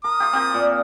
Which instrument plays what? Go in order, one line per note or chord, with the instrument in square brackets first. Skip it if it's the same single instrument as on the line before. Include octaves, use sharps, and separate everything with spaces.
[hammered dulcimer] A#4 [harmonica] D#6
[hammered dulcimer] F4 G4
C4 G4 A#4
A#2